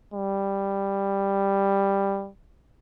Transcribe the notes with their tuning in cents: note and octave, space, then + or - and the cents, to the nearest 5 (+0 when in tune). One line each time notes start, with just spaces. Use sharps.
G3 +5